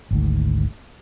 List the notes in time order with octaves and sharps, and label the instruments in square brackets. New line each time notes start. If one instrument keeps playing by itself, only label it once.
[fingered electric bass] G#1 D2 G#2